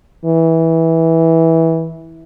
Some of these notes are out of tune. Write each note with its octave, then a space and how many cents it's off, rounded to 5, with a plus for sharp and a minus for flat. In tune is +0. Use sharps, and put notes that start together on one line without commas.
E3 -15